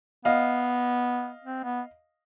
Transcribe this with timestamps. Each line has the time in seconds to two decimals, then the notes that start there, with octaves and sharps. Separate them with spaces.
0.25 B3 D#5 F5
1.44 C4
1.63 B3